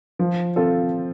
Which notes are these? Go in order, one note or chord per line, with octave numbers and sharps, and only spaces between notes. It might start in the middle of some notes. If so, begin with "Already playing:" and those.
F3
C4 F4 A4